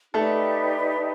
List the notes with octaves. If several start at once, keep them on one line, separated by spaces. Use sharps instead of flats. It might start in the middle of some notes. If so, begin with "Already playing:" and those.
A3 D#4 G4 A4 B4 D5